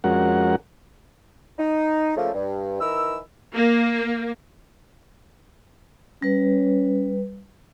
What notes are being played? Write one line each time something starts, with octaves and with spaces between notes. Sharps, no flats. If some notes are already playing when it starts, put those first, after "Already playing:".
F2 G#3 C#4 F#4 A#4 F#5
D#4
C#3 F3 A3 A#3
G2
E3 D#4 A#4 B5 E6
A#3
G3 C#4 B4